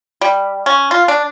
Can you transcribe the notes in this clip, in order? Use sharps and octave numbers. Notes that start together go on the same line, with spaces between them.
G3
C#4
F4
D4